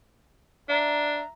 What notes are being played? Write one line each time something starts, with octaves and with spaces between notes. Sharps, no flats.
D4 E5 A#5